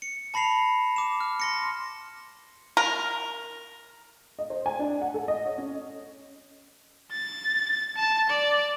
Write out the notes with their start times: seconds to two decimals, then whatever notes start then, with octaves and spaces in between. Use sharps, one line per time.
0.02 C#7
0.34 A5 B5 A#6 C7 F7
0.96 D6 E7
1.20 F6
1.40 C6 A#6 C#7
2.77 A#4
4.39 D#5
4.50 C5
4.66 G#5
4.79 D4
5.02 F#5
5.14 A4
5.28 D#5
5.46 C#5
5.58 C#4
7.12 A6
7.96 A5
8.30 D5